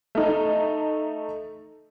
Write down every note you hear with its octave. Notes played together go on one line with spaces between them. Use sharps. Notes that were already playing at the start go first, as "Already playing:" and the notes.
A3 D#4